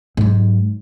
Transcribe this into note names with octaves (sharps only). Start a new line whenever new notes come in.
G#2 F#3